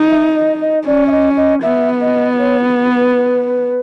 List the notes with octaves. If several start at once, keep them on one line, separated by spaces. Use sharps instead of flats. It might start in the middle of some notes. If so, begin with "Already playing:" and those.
Already playing: D#4
E5
D#5
D#5
C#4 D5
E5
D#5
D#5
B3 E5
D#5
C#5
B4